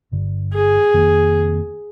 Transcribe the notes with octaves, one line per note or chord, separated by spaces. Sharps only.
G1 G2 D3
G#4
F1 F2 D#3 A#3